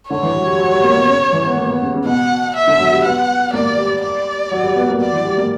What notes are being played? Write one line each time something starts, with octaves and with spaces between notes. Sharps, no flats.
D3 C#5
E3
F#3
G3
F#3
G3
A#3
B2
C#3
E3
B3
A#3
B3
C#3
C#3
B2 F#5
E5
D3
F#3
G3
B3 F#5
A#3 D5
G3
D5
F#3
G3
B3
A#3
F#3 D5
E3
G3
A#3